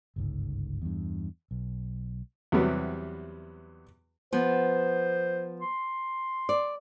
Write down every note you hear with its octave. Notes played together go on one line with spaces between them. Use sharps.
G1 C#2 G#2
E2 G2
B1
E2 C3 F#3 G3 B3
F3 B3 C5
C6
D5